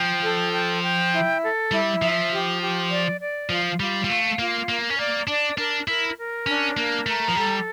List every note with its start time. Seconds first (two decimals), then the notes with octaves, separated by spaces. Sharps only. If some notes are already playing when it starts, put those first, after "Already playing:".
Already playing: F3 G5
0.23 A4
0.53 G5
0.82 G5
1.12 E4
1.42 A4
1.71 G3 E4
2.01 F3 E5
2.31 G4
2.61 G4
2.90 D5
3.20 D5
3.50 F3 F4
3.80 G3 F4
4.04 G3
4.09 A3 F5
4.39 A#3 F4
4.69 A#3 A#4
4.90 C#4
4.99 A#3 D5
5.28 D4 D5
5.58 D4 A#4
5.87 E4 A#4
6.17 A#4
6.47 C#4 D4
6.77 A#3 A#4
7.06 A3 A#5
7.28 F3
7.36 G3 A4